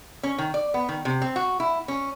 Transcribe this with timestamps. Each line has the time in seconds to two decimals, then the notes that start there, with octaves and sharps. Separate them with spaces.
0.23 C#4
0.38 D#3
0.54 D5
0.74 B3
0.89 D#3
1.05 C3
1.22 C4
1.36 F#4
1.60 E4
1.88 C#4